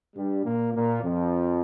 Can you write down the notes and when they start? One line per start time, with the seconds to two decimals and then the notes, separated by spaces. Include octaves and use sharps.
0.15 G2 G3
0.45 A#2 A#3
0.74 A#2 A#3
1.03 F2 F3